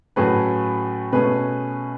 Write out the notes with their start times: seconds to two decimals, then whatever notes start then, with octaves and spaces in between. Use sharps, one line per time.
0.16 A2 F#3 A3 C#4 G#4 B4
1.13 B2 A3 C#4 G#4 B4